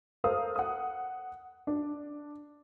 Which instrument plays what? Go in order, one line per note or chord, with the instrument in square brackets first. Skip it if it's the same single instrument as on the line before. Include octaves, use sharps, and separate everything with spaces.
[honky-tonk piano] A4 A#4 C5 F5 D#6
F#5 D#6
D4